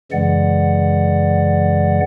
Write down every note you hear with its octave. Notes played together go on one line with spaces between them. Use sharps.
F#2 C#3 E3 G#3 D5 F#5